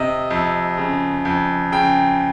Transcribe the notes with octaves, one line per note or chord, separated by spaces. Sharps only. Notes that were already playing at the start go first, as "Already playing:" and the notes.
Already playing: C3 D#5
F2
C#3
F2
C#3 G5